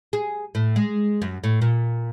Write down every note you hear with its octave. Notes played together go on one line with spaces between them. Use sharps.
G#4
A2
G#3
F#2
A2
A#2